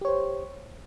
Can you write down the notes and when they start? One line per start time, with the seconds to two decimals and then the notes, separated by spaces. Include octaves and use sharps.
0.01 G4
0.05 C#5
0.08 C5